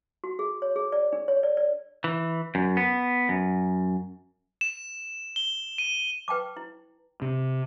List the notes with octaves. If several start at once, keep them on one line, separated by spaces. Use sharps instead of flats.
F#4
G#4
C#5
G#4
D5
D4
C#5
D5
D5
E3
F#2
B3
F#2
E7
G7
D#7
B4 G5 A5 D6
E4
C3